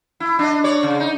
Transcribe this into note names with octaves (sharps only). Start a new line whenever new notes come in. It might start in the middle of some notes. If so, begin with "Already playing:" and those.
E4
D4 D#5
C#5 D5
C#3
D#4